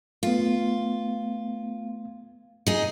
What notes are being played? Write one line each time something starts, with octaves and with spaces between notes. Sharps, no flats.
A3 B3 F4
D#4 G#4